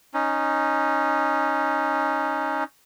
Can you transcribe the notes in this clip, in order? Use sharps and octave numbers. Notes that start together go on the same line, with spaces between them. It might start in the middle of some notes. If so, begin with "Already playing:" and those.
C#4 D#4